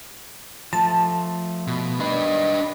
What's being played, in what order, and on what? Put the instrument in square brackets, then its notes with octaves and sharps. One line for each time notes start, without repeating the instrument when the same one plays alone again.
[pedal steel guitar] F3 A3 [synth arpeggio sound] A5
[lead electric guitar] B2
[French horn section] D#3 D5 D#5 [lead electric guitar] D4 B4